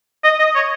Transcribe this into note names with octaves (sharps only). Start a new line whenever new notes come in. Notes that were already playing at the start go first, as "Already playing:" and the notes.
D#5
D#5
C#5